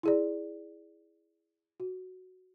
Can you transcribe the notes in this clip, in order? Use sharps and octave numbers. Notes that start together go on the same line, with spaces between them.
E4 G#4 D5
F#4